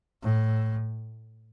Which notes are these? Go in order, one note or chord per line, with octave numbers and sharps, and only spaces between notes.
A2